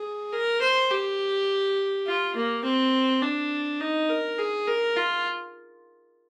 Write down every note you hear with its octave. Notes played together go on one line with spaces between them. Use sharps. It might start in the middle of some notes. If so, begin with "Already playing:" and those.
Already playing: G#4
A#4
C5
G4
F4
A#3
C4
D4
D#4
A#4
G#4
A#4
F4